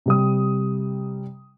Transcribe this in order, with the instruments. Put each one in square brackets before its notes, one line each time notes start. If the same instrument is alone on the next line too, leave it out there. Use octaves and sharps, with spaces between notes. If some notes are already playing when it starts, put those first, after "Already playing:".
[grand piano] C3 G3 D#6